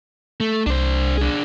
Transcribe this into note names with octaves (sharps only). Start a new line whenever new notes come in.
A3
C2 D4 C5
D4 G#4